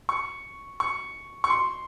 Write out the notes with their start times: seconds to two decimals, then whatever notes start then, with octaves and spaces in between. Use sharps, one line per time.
0.09 C#6
0.80 C#6
1.44 C#6
1.50 C6